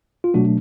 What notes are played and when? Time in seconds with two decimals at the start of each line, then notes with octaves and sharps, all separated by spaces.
0.24 F4
0.34 B2 F#3 A3 D4 F#4